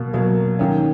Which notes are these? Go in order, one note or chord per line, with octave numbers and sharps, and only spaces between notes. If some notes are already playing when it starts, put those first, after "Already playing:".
Already playing: B2 F#3 A#3
B2 F#3 A#3
D#3 A#3 C#4